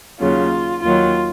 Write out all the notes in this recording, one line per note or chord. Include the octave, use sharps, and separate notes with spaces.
D#2 C#3 F#3 F4
D#2 D#3 F#3 F4